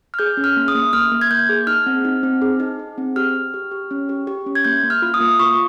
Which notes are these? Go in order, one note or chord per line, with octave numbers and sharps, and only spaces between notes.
F6
G#4 G6
C#4
F6
A#3
D#6
A#3
A#3 F6
A#3
G#6
A#3 G6
G#4
D#4 F6
C4
D#4
C4
G#4
D#4
G#4
C4
G4 F6
G4
G4
G4
C#4
G4
G4
C#4
G#6
A#3 G6
A#3
F6
F4
D#6
A#3
F4 C#6